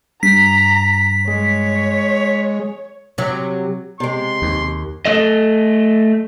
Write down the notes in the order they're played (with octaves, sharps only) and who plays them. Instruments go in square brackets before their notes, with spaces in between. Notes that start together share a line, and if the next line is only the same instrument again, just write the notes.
[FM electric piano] G2 [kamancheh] A#5 [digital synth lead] B6
[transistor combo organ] G#3 [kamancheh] C#5
[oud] C3 F#3
[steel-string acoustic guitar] C3 G#3 [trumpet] C6
[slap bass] D#2
[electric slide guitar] A3 A4 D#5